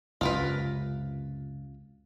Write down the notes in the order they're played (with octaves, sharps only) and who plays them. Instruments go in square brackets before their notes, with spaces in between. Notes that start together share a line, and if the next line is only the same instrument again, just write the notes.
[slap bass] C#2 F#2 C3 [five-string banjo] F4 A#4 B4